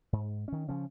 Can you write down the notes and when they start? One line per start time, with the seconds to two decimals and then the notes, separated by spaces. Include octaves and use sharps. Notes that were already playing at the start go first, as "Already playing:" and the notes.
0.13 G#2
0.48 D#3 C#4
0.69 C#3 F3 C#4